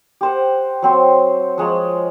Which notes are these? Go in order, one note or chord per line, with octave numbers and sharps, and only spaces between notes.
G4 C5 F#5
F#3 C4 C6
F3 G#3 C#5 A#5